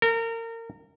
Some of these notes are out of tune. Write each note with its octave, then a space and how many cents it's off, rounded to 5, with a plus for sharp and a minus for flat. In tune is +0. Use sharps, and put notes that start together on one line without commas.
A#4 -30